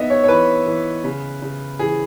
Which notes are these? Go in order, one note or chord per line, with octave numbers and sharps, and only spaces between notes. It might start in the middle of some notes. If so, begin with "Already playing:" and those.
Already playing: B3 D#4 D#5 E5
C#5
C#5
E3 B4
E3
C#3
C#3
E3 G#4